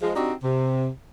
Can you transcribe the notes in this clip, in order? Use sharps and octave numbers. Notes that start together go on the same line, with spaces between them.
F3 G#3
C4 D4 D#4 F#4 G4
C3